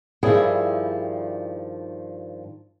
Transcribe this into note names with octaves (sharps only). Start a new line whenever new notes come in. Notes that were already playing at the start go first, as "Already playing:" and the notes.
G2 D#3 F3 G3 E4 G#4